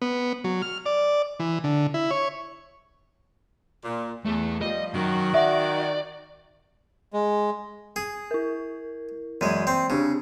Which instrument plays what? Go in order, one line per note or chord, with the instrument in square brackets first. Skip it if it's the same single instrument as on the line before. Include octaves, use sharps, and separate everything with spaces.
[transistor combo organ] B3
F#3
F6
D5
E3
D3
E4
C#5
[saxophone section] A#2
[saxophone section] E2 [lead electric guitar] A3
[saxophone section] F3 G3 [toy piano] F4 B4 [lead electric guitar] D#5
[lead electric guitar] F#2 F#3 [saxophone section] D#3 F#4
[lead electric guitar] D5 [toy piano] E5 F#5
[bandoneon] G#3
[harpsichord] G#4
[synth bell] E4 A#4
[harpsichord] F#2 G#3 [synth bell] E3 D5 D#7
[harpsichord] C4
[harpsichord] C#3 [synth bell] C4 D4 G4